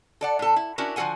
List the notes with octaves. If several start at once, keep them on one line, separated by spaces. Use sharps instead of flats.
A4 D5 F#5
A2 A4
E4
C#4 D4 E4 F#4 A#4
D3 F3 F#4 A4 F#5 G#5